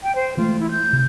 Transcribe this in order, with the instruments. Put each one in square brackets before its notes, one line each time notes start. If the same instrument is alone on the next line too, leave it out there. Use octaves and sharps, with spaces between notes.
[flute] G5
C5
[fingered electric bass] E3 G#3 A3 [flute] F4
[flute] E4
G6
[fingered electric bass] C3